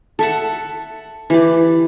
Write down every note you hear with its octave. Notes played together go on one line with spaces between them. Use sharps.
A4 E5 F#5
E3 G4 D5